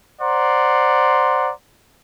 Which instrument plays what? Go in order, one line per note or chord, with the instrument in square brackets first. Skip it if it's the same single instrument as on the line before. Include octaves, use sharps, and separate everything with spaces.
[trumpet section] C5 D5 F#5 A#5 C6